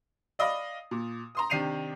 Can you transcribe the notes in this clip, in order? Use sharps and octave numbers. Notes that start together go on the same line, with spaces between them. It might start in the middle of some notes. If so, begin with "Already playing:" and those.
D5 D#5 F5 B5 D#6
A#2
A#5 C6 D#6
C3 D#3 D4 C7 D#7 F7